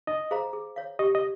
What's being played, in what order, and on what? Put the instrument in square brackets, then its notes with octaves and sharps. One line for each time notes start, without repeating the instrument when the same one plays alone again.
[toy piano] D#4 [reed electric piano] D#5
[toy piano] G#4 C5 F5 A#5
G#4
C#5 F5
[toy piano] G4 [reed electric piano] D#5
[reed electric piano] D#5